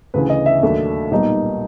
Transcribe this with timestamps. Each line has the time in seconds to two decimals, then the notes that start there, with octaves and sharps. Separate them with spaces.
0.14 D2 C#3 E3 B4
0.30 D#5
0.46 E5
0.62 D#2 D#3 F#3 A3 D4
1.11 B1 A#2 G3 B3 D#4